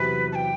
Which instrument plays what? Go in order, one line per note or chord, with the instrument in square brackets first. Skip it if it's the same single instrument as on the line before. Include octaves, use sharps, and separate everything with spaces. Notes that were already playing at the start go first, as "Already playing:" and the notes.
Already playing: [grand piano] E2 C3 F#3 [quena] B4
[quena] A5
G5